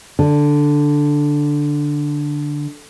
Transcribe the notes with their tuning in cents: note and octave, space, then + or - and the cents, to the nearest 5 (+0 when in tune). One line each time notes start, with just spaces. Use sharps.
D3 +0